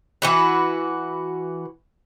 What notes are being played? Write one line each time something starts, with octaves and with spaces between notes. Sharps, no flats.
E3 F#4 B4